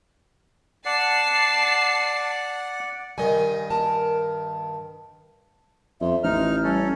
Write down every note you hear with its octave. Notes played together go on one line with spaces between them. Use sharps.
D5 F#5 A5 C7
G2 D#3 D#5 G#5
A#4 A5
F2 E5
A1 D#4 F6
G3 C#4 A4